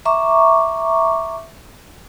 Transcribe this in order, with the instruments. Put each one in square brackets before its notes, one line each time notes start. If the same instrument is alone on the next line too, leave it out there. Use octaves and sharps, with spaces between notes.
[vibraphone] E5 A#5 C#6 D6